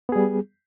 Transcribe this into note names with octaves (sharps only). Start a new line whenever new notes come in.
G3 B3 G#4